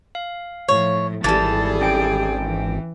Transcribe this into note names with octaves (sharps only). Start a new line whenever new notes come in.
F5
A2 F3 C#5
G#1 E3 G3 G#4 A4 A5 A6
C#4 G5 D7
E3